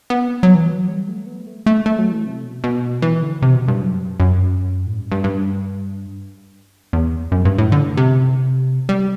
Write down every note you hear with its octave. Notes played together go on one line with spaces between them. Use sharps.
B3
F#3
E3
F#3
G3
A3
B3
A3
A3
A3
F#3
E3
C3
B2
B2
E3
D3
C3
B2
G2
F#2
F#2
A2
G2
G2
G2
E2
F#2
G2
A2
D3
C3
G3